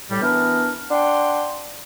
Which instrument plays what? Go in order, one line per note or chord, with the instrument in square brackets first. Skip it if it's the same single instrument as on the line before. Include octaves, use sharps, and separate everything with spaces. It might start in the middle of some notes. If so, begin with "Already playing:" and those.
[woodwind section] A2 G3
E3 B3 D4 A#4
D4 F#5 G5 C6